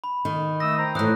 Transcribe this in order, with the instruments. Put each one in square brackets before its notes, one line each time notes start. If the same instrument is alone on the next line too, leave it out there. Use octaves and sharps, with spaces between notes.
[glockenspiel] B5
[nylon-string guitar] D#3
[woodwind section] A3 D#6 E6 [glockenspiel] A#6
[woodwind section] C5 G5 A#5
[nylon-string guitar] A2 E3 [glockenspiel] D#6 F#6